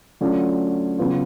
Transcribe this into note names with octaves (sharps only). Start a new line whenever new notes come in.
D3 F#3 A3 C#4 F4
C#3 F#3 B3 F4